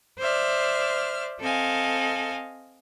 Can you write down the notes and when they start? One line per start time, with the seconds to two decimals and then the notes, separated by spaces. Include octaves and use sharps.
0.19 C5 D5 E5 F6
1.40 C4 A4 D#5 F5 G#5